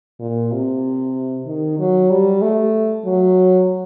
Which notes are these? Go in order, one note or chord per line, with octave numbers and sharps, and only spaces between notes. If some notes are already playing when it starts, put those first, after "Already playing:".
A#2
C3
D#3
F#3
G3
A3
F#3